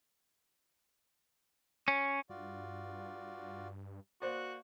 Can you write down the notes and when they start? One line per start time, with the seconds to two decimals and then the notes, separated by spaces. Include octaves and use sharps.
1.88 C#4
2.30 G2 F4 F#4 D5
4.22 A#3 F#4 C5 D5 F#6